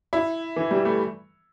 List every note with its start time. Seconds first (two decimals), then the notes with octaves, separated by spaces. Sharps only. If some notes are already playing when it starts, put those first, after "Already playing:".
0.13 E4
0.56 E3
0.71 G3
0.85 A3